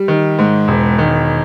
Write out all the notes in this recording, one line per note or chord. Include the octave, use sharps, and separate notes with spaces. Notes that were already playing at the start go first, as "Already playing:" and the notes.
Already playing: G3
D#3
G#2
E1
D#3